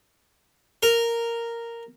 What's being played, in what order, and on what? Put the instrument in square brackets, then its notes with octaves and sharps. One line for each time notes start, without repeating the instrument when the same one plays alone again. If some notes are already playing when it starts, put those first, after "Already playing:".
[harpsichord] A#4